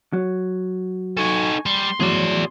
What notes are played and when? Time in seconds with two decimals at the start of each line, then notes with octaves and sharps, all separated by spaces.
0.13 F#3
1.17 D#4 A4 G#5 C#6
1.66 G3 C6
2.00 E2 A2 F#3 G#4 D5